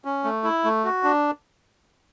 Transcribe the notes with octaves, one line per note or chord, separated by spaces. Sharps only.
C#4
A3
E4
A3
F#4
D4